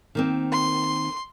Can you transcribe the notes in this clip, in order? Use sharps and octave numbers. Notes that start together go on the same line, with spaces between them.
D#3 A#3 C4
C6